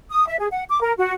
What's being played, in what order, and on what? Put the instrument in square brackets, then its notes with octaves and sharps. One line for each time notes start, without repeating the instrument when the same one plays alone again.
[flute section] D#6
E5
G#4
F#5
D6
A#4
F#4